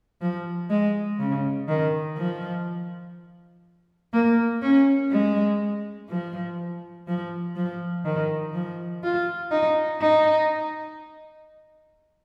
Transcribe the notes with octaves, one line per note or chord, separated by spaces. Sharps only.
F3
G#3
C#3
D#3
F3
A#3
C#4
G#3
F3
F3
F3
D#3
F3
F4
D#4
D#4